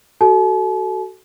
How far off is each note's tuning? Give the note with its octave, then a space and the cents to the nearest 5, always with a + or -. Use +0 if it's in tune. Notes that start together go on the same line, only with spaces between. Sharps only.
F#4 +25 A4 +0 A5 -45